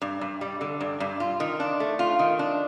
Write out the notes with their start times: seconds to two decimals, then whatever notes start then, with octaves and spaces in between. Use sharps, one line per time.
0.02 G2
0.21 G2
0.41 G3
0.61 D3
0.81 G2
1.00 G2
1.20 F4
1.40 D#3
1.60 D4
1.80 A3
1.99 F4
2.19 D#3
2.39 D4